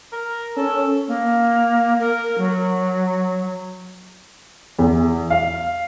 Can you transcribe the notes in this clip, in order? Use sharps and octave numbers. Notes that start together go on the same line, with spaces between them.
A#4
C#4 A4
A#3
A#4
F#3
E2
F5